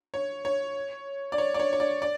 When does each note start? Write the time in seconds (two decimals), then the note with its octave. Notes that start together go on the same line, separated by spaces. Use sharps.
0.14 C#5
0.45 C#5
1.32 D5
1.38 C#5
1.54 D5
1.60 C#5
1.73 C#5
1.80 D5
2.02 D5